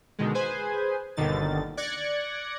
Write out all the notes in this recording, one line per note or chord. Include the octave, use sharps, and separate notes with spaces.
B2 D3 D#3 G#3
G#4 B4 C5 G#5
G1 D#2 B2 D3 D#3 A6
D5 F#6 G#6 A#6 C#7